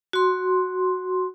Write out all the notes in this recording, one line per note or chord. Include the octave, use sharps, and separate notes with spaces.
F#4 C6